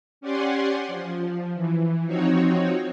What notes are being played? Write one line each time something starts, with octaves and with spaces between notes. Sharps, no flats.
C#4 G4 D5 F#5 G#5 C6
F3
E3
F3 C4 D#4 F#4 C#5